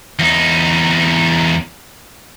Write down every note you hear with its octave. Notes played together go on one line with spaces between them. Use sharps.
E2 D#4